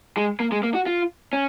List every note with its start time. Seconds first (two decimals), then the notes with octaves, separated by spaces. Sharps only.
0.17 G#3
0.40 A#3
0.52 G#3
0.63 A#3
0.74 F#4
0.86 F4
1.33 C#4